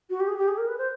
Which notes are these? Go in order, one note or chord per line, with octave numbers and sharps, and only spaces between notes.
F#4
G4
G#4
G4
G#4
A#4
B4
C5